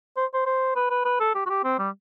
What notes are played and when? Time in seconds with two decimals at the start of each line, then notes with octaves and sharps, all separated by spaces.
0.17 C5
0.34 C5
0.46 C5
0.76 B4
0.90 B4
1.05 B4
1.20 A4
1.35 G4
1.46 F#4
1.50 G4
1.64 C4
1.79 G3